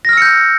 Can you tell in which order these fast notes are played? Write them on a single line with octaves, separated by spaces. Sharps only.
A#6 F6 E6 C#7 G6